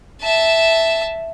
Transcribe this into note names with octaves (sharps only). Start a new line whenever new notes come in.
E5 A5